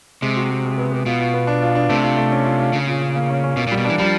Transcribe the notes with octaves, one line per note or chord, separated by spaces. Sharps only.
C3 G#3
F#4
G#3
G#3
B3
B3
B2 F4
F4
B3
D4
F4
D4
C3 A3
F4
A3
C#4
F4
F4
C#3 C#4
A#2
C#4
A#3
C#4
C#4
B2 A#3
A#2 G3
B2
E3 D4
F3 G3